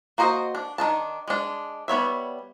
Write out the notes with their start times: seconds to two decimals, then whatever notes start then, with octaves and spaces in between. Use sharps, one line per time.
0.18 A#3 F#4 C5 D#5
0.55 D4
0.78 D#3 D4 A5
1.28 G#3 D4
1.88 G3 B3 C#5 E5